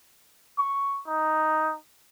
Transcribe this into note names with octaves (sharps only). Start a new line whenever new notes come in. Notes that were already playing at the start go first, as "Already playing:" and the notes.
C#6
D#4